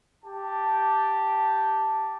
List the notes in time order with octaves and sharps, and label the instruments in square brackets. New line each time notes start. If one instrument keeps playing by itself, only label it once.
[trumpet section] G4 A5